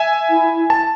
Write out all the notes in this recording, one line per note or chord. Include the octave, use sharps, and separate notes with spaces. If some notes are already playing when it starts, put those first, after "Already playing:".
Already playing: E5 G#5
E4
A5